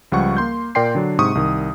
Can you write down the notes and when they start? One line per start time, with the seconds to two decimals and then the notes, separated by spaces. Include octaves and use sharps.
0.12 C#2 F3 G3 F#5 C#6
0.37 A#3 C6 G6
0.75 A#2 A#4 D5 G5 C6 C7
0.95 D3 F#3 D4
1.19 G#2 C3 C#6 D#6
1.35 C2 D#3